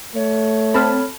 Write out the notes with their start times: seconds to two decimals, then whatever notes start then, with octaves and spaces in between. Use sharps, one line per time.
0.15 A3 C#5
0.74 C4 A4 A5 B5 F6